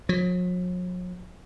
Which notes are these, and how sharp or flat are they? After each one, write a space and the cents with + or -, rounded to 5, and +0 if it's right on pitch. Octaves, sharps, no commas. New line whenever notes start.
F#3 -45